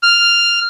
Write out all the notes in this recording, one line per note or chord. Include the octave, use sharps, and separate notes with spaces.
F6